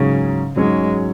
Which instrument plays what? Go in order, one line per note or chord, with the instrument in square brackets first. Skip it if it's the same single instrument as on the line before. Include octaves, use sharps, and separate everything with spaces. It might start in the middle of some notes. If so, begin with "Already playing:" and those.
Already playing: [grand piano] G#2 F#3 C#4 G#4 C#5 [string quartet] C#3
[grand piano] G#2 F#3 C#4 G#4 C#5 [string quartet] G#3